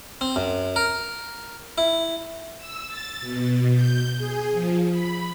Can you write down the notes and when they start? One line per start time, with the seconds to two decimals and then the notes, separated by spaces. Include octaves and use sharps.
0.21 C4
0.36 F#2
0.76 A#4
1.78 E4
2.57 E6
2.87 A6
3.21 B2
3.74 G6
4.17 G#4
4.52 F3
4.90 B5